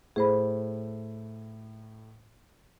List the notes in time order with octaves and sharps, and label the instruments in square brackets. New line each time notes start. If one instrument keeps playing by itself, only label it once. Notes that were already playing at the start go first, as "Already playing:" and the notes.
[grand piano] A2 [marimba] G#4 C5 B5